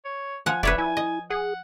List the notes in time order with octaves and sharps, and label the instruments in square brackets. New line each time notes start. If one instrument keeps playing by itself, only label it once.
[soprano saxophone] C#5
[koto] F3 F#5 [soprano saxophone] G#5
[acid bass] F1 [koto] B4 C#5 D5 [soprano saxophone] E5
[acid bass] E4 [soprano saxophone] G#5
[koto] D#5
[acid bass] G#4 [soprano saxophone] F#5